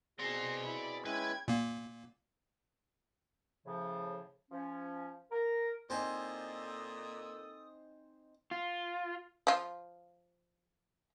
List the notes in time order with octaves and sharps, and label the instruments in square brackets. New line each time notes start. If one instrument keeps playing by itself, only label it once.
[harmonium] B2 C4 G#4 [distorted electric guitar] D5 C6 [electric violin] A#6 C7
[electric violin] E4 B5
[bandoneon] G#3 C#4 E4 [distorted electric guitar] B4 [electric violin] G5 G#6
[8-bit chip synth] A#2 A#3
[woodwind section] A2 C#3 F3
F3 C#4
A#4
[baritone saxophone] A#2 [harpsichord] C4 G#5 [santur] D#4 C5 [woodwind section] A4 D#6
[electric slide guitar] F4
[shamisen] F3 F4